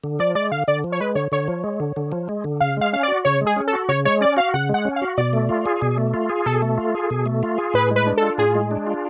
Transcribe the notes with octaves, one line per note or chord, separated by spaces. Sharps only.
D3
F3 D5
G#3 D5
D3 F5
D3 D5
F3
C#5
G#3 B4
D3 C#5
D3 C#5
F3
G#3
D3
D3
F3
G#3
D3
C#3 F5
G#3 F5
C#4 F5
D5
F#4
C#3 C#5
G#3
G#4
C#4
A4
F#4
C#3 C#5
G#3 C#5
C#4 D5
F#4 F5
C#3 F#5
G#3 F#5
C#4
F5
F#4
B2 D5
A3
F4
G#4
B2
A3
F4
G#4
B2 A4
A3
F4
G#4
B2
A3
F4
G#4
A2 B4
G#3 B4
D4
A4
F4
A2 G#4
G#3
D4
F4